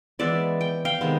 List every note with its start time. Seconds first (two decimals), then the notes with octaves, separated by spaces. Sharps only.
0.19 E3 G#3 B3 D5 E5
0.61 G5
0.85 F5 G5
1.01 C3 D#3 G#3 B3